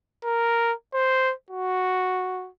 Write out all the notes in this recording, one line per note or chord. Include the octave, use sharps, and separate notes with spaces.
A#4
C5
F#4